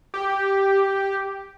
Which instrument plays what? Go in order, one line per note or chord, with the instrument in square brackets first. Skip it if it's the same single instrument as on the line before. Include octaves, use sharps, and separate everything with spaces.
[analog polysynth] G4